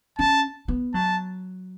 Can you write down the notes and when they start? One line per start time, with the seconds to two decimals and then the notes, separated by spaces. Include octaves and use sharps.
0.19 C#4 A5
0.68 B3
0.94 F#3 A5